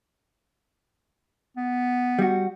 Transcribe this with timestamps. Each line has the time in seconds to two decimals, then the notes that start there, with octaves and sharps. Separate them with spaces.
1.57 B3
2.19 G3 F#4